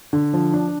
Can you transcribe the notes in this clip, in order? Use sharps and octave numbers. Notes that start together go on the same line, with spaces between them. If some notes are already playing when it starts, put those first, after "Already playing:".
D3
F3
D4